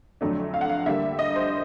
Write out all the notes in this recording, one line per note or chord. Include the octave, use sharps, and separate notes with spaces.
F2 D3 F#3 A3 D4
F5
F#5
F5
D3 G3 A#3 E5
D#5
C5